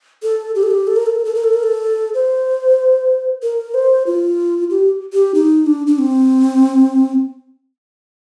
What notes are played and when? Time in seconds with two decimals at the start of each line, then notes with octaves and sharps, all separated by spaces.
0.23 A4
0.55 G4
0.63 A4
0.71 G4
0.87 A4
0.96 A#4
1.06 A4
1.15 A#4
1.25 A4
1.35 A#4
1.44 A4
1.54 A#4
1.63 A4
2.14 C5
3.43 A#4
3.74 C5
4.07 F4
4.70 G4
5.13 G4
5.35 D#4
5.66 D4
5.87 D4
5.99 C4